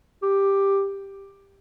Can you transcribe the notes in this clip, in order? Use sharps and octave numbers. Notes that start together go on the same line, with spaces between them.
G4